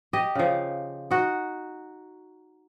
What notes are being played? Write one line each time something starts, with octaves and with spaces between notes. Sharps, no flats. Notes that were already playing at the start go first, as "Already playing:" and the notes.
G4 D#5
C#3 F3
D#4 F#4